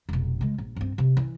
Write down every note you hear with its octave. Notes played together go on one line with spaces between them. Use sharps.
F1 B1
C#3 G#3
A#1
G2 C4
C3
E3